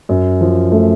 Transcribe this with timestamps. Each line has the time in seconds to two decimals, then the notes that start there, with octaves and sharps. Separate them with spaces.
0.09 F#2
0.41 F3
0.72 A3